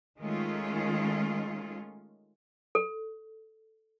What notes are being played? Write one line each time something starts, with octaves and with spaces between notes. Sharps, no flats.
D#3 G#3 A3 C#4 F4
A4